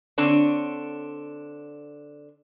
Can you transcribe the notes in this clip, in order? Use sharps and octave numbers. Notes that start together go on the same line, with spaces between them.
D3 C4 D4 C#5